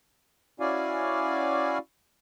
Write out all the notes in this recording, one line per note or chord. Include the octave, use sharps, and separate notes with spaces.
C#4 E4 F#4 D5 F5 G#5